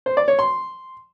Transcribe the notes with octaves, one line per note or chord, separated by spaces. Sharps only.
C5
D5
C#5
C6